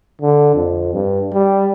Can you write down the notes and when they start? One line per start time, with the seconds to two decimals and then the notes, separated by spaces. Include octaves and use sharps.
0.22 D3
0.55 F2
0.94 G2
1.33 G3